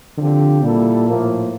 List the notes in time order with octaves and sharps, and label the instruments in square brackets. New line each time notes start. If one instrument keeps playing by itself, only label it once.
[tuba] D3 [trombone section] F3 C4 G4
[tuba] A#2 [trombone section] G3 A#3 E4 A4
[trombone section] A2 F3 A#3